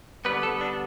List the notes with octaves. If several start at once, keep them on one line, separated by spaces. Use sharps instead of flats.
D3 G3 B3 B4
A4
D4